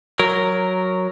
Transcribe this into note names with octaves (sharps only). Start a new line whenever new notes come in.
F#3 A#4